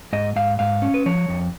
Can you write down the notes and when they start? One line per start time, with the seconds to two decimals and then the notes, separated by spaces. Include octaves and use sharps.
0.13 G#2 D#5
0.36 G#2 F5
0.59 G#2 F5
0.82 C#4
0.94 B4
1.06 F3 C#5
1.28 F2